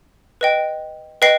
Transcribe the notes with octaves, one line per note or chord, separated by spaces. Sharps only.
B4 D#5 G5
B4 D#5 G5 C7